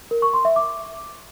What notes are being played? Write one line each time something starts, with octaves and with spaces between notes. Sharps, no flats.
A#4
C#6
C6
E5
D6